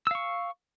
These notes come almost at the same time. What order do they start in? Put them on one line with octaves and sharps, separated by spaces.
E6 F5 C#6